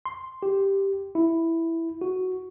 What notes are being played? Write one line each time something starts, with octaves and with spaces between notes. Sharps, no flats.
C6
G4
E4
F#4